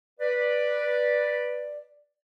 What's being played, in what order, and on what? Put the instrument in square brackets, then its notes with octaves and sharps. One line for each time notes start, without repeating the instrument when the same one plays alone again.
[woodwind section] B4 D5